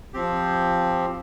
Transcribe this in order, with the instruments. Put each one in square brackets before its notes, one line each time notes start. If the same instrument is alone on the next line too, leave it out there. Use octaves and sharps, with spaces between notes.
[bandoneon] F3 C4 G4